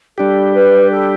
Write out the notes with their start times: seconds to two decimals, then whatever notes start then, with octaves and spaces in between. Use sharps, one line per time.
0.18 G3 D4 G4 A4
0.54 B4
0.91 A4